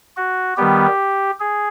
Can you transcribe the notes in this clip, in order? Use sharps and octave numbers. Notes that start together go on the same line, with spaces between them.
F#4
D#3 G3 B3 G4
G#4